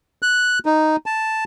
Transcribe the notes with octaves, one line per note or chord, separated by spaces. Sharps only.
F#6
D#4
A5